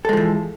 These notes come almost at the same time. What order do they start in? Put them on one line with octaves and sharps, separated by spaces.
A4 G#3 F3 E3